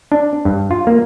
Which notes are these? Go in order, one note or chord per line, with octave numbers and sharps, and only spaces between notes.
D4
G2
F4
A#3